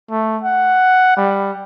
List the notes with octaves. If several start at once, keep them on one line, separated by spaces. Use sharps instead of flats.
A3
F#5
G3